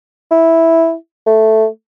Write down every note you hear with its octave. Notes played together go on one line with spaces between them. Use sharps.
E4
A3